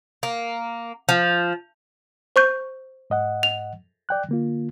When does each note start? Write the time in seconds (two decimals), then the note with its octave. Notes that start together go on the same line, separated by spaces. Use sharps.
0.23 A#3
1.09 F3
2.36 C5 C#6 G6
3.10 G#2 D#5 F#5
3.43 F7
4.09 D5 G5 F#6
4.29 D3 A#3 F4